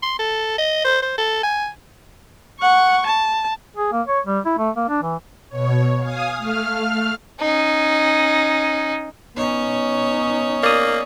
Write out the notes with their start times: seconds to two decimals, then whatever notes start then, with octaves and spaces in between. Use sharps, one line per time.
0.03 C6
0.19 A4
0.58 D#5
0.84 C5
1.02 C5
1.18 A4
1.43 G#5
2.60 F#5 C#6
3.07 A5
3.76 G#4
3.92 A#3
4.07 C#5
4.26 G3
4.45 E4
4.58 A3
4.76 A#3
4.89 D4
5.03 E3
5.49 B2 C#5
6.00 F5 G#5 D#6
6.38 A3 F5 F6
7.40 C#4 D#4
9.37 B3 C#4 D#4 C#5
10.63 A#3 D5 D#6